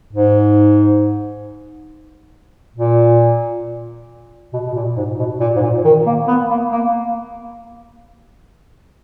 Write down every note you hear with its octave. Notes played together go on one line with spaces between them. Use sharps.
G#2
A#2
B2
B2
A#2
G#2
B2
A#2
G#2
A#2
D#3
A#3
B3
A#3
A#3